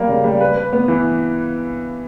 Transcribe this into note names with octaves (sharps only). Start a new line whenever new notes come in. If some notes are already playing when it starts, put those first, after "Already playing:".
Already playing: G3 A#3
C#3
G3
B4
B4
B3
E3